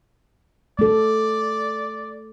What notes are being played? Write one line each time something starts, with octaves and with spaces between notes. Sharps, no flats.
A3 A4 D5